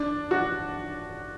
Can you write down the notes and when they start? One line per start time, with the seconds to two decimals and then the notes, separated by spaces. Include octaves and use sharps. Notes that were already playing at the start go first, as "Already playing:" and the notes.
Already playing: D4
0.31 F#4